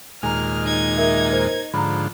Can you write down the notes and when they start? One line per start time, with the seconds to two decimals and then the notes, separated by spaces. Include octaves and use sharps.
0.23 D#2 A#2 G#3 G#5 A#5 F6
0.63 D#4 G#6
0.97 A#4 E5
1.31 A#4 C5
1.74 G#2 D3 F3 A#5 B5